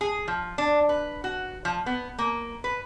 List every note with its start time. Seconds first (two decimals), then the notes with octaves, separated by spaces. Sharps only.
0.01 G#4
0.28 F3
0.58 D4
0.89 B4
1.24 F#4
1.65 F3
1.86 B3
2.18 A#3
2.64 B4